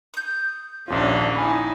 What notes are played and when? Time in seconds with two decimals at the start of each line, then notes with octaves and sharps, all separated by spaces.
0.14 D#6 G6
0.88 A#1 D#2 C#4 D4 F4
1.36 D#4 E4 G#5 B5